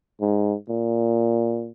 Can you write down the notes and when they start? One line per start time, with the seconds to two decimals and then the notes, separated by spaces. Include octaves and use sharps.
0.21 G#2
0.69 A#2